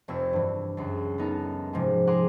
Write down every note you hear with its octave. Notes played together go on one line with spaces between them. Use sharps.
F1 F2 E6 G#6
G2 E3
C#2 F#2
B3 D#4 A4 A#4
G#2 C3 F3 G#3
G#4 F#5 A#5 C6 D6